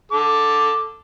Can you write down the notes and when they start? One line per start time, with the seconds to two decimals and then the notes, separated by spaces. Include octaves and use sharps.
0.11 A4 D6